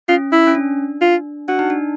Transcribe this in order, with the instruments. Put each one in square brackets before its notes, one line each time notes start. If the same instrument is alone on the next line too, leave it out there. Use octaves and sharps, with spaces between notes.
[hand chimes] C#4 [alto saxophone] F4
[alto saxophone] E4
[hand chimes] C#4
D4
[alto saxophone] F4
[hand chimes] D4 [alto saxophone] F#4
[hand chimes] D#4
D4